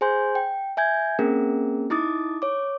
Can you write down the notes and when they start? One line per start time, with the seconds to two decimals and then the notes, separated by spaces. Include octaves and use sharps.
0.01 G#4 C5 G#5 C6 G6
0.35 G5
0.77 E5 G#5 G6 G#6
1.19 A#3 C4 C#4 G#4 A#4
1.90 D#4 E4 D6 D#6 A6
2.42 C#5 D6